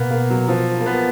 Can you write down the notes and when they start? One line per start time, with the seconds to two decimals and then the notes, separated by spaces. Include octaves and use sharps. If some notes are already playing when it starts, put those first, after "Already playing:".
Already playing: B2 A#3 B3
0.10 A#3
0.30 F#3
0.48 F3
0.80 A#3
0.86 B3